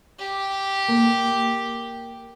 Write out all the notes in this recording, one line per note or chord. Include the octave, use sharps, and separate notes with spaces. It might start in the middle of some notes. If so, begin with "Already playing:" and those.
G4
A#3